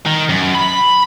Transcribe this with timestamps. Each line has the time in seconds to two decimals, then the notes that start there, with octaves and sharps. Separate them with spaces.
0.06 D#3
0.29 F#2
0.55 B5